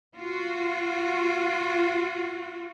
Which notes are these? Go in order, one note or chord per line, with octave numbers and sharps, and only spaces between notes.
F4 F#4